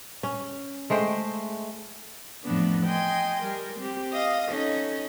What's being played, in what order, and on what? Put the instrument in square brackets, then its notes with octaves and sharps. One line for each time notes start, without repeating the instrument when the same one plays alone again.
[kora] C#4
G#3 A3 C5 G5
[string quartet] F2 A2 E3 F3 B3 D4
D#5 G5 G#5 C6
G3 A#4
C4 G4
D#5 F5 D#6
C#4 D#4 A4 D#5